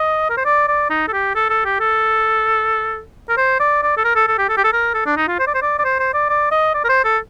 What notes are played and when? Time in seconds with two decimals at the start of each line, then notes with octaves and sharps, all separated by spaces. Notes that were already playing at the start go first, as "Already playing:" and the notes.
Already playing: D#5
0.30 A#4
0.37 C5
0.46 D5
0.68 D5
0.90 D#4
1.08 A4
1.13 G4
1.35 A4
1.50 A4
1.65 G4
1.80 A4
3.29 A#4
3.38 C5
3.60 D5
3.83 D5
3.97 A4
4.05 A#4
4.16 A4
4.28 A4
4.38 G4
4.49 A4
4.57 G4
4.64 A4
4.73 A#4
4.94 A4
5.06 D4
5.17 D#4
5.28 F4
5.40 C5
5.47 D5
5.55 C5
5.62 D5
5.79 D5
5.85 C5
6.00 C5
6.14 D5
6.29 D5
6.51 D#5
6.75 D5
6.85 A#4
6.89 C5
7.05 A4